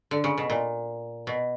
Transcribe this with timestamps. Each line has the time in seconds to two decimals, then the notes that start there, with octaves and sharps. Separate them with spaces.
0.11 D3
0.24 C#3
0.38 B2
0.50 A#2
1.27 B2